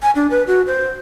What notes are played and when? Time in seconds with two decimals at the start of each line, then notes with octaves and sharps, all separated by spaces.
0.02 G#5
0.16 D4
0.30 B4
0.47 F#4
0.67 C5